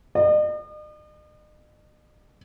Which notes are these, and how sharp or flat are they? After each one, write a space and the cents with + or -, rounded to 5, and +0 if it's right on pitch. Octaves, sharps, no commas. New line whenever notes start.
D#5 -45